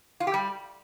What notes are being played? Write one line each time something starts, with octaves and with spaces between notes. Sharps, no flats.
F4
G4
G3